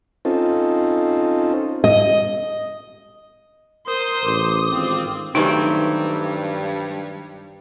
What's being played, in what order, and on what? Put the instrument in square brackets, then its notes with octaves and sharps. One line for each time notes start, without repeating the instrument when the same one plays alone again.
[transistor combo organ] C4 C#4 D#4 F4 A4
[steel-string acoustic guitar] D#5
[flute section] A#4 [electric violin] C5 [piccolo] D#6
[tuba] A1 [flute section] D6
[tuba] G#1 [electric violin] C4 F4
[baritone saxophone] G2 [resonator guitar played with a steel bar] D#3 F#3 A3 [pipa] E3 C4 [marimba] D#4 G4